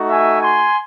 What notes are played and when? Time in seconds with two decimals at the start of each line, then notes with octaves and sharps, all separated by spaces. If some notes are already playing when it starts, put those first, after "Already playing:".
Already playing: A3 D#4 F#4
0.09 E5 G#5
0.41 G#5 C6